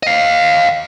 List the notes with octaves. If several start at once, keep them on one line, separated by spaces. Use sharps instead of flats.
D#5 F5